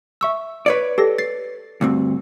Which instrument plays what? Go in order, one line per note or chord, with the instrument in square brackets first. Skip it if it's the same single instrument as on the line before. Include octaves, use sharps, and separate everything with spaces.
[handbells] E5 C#6 E6
[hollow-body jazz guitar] B4 C#5 D5
[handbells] G4 A4 A#6
A6 C7
[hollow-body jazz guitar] D2 G2 C4